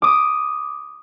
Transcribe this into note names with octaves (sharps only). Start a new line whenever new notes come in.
D6 D#6 D#7